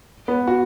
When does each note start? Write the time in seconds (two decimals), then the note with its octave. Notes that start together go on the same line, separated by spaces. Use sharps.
0.28 B3
0.47 F#4